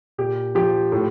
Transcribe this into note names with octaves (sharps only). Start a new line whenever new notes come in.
A#2 G4
F3 G4
A2